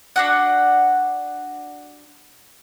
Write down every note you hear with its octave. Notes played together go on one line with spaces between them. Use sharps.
D4 F#4 F#5